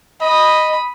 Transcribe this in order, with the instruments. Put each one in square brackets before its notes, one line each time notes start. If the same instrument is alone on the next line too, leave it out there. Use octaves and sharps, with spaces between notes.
[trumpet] D#5 [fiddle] B5 D#6